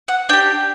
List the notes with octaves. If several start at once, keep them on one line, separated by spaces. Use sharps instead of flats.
F#5
D4 G4 G5